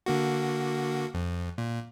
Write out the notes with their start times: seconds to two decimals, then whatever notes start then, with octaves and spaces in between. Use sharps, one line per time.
0.06 D3 A#3 F#4
1.14 F2
1.58 A#2